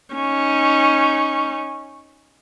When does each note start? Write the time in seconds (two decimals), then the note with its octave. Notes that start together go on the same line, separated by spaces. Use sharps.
0.15 C#4 D#4